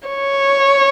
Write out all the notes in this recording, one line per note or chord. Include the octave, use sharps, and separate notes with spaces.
C#5